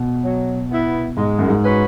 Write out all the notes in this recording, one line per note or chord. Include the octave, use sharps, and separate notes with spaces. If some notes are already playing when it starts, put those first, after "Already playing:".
Already playing: B2
F#3
B3 E4
G#2 G#3
F#2
G#2
C#4 F#4 B4